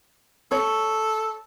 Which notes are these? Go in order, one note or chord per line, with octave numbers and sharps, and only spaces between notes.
A4 C#5